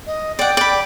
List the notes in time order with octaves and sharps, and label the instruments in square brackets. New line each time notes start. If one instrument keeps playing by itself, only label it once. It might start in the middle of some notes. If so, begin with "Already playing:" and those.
[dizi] D#5
[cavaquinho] D5 F#5 [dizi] G5
[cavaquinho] D5 B5